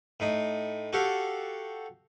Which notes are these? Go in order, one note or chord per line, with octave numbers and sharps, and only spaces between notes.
A2 D#4
F#4 G4 A4 F5